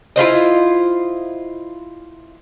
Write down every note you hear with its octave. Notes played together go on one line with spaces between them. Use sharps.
E4 F4 C5 D#5